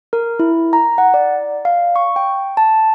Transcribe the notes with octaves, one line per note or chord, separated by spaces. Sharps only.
A#4
E4
A#5
F#5
D5
F5
C#6
G5
A5